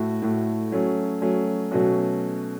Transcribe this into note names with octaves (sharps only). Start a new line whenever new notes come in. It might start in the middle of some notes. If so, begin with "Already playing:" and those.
Already playing: A2 A3 F#4
A2 A3 F#4
F#3 A3 C#4
F#3 A3 C#4
B2 F#3 A3 C#4 F#4